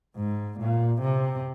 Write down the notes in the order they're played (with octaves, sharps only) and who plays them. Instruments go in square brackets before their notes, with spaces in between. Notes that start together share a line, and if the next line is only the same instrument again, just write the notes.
[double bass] G#2
A#2
C3